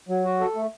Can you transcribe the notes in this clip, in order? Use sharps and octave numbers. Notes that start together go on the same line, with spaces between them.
F#3
F#4
A4
A3